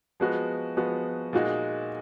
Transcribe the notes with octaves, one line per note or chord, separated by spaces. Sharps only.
F3 G#3 B3 F#4
F3 G#3 B3 F#4
A#2 G#3 D#4 F#4